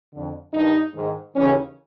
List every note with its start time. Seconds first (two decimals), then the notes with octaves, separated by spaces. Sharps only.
0.13 F2 D3
0.53 G2 D#3 D#4
0.94 G#2 D#3
1.36 D#2 C#3 E3 C#4